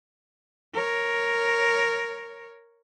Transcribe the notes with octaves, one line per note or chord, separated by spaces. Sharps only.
A#4 C#5